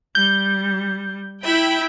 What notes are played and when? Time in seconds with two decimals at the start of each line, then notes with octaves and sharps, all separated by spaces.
0.15 G3 G6
1.44 E4 E5 G5 B5